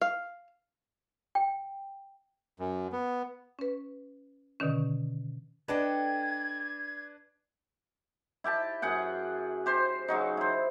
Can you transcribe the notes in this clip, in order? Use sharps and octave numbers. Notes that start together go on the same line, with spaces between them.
F5
G5
F#2
B3
C#4 B4
B2 D3 D#3 C#4
D4 A4 B4 D#5 G5 G#6
E4 G4 G5 A5
F#2 G#4 F#5 G5
G4 C5 C6
C#3 F#3 D#4
E4 C5